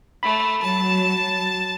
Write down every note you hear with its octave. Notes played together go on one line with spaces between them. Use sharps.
A3 B5
F#3 A5